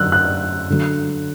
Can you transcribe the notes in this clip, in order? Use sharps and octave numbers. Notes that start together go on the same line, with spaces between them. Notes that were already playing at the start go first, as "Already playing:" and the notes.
Already playing: F#2 D3 F#3 E6 F#6
F#6
D3 F#3